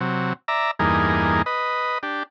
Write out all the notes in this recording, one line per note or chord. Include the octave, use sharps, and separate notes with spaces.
C3 F#3
D5 E5 A#5
E2 G2 A#3 D#4 G#4
B4 D#5
D4 G4